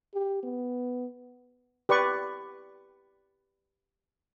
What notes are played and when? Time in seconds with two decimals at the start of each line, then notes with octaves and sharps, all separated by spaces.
0.14 G4
0.43 B3
1.89 G4 B4 D5 C#6